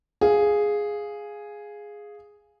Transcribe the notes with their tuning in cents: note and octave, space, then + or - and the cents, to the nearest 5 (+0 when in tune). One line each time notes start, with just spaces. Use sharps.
G#4 +0 F5 +0